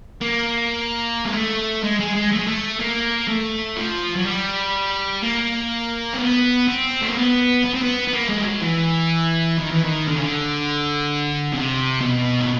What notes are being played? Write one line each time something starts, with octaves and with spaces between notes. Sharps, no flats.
A#3
G#3
A3
G#3
G#3
G#3
A3
G#3
A3
A#3
A3
F3
F#3
G3
A#3
C4
B3
C4
A3
A#3
B3
B3
C4
B3
B3
A#3
G#3
G3
F#3
E3
D#3
E3
D#3
D3
C#3
D3
C3
B2
A2